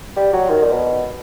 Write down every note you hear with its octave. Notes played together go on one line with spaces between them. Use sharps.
G3
F#3
D#3
A#2
B2